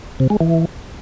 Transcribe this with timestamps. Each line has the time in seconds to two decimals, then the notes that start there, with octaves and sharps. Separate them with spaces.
0.20 C3
0.30 G#3
0.40 E3